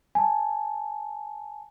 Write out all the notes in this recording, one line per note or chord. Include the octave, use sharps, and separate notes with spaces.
G#5 A5